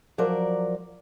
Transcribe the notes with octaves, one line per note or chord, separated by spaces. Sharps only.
F3 F#3 A#4 D5